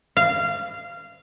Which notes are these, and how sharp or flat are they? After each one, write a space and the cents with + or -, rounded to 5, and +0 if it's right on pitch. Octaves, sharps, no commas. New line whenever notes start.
F5 -20